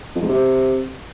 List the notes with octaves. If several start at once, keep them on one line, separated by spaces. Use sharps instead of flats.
F2
G#2
C3